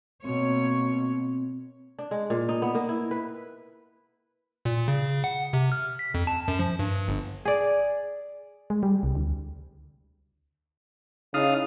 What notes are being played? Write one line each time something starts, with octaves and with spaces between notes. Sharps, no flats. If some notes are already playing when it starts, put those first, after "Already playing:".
B2 A#3 C4 C#5
D4
G#3
A#2
D#4
B3
A#3
E4
B4
A#2
C#3
F#5
C3
F6
B6
F2
A5
F#2
F3
G2
G1
G#4 D5
G#3
G3
C2
D2
C#3 D#4 E4 D#5 F5 D#6